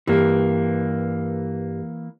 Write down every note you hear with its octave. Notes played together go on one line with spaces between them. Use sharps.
G2 E3 A#3